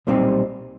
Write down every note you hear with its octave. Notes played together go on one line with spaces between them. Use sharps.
B1 A#2 G3 C4 D#4